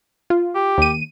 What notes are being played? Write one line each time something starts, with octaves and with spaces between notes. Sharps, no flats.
F4
G4
D#2 D#7